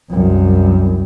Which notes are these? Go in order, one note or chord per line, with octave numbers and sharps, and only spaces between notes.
C2 F#2